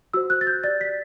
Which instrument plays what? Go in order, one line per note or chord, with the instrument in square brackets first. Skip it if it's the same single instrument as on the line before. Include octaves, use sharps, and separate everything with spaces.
[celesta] F#4 C5 E6
F#6
A6
G6
G4 D5 A6
B6